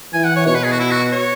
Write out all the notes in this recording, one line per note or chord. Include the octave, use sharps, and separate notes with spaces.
E3 G#5
F#5
C#5
B2 C#5
B4
G#4
F#4
E4
F#4
C#5